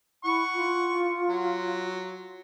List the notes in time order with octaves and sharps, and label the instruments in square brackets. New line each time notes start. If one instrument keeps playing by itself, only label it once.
[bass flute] E4 [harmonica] F#5 C#6
[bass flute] F4
[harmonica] F#3